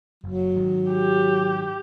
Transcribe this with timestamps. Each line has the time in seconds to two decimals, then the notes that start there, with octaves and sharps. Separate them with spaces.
0.24 F#1 F#3
0.55 G#2 D#3
0.92 G4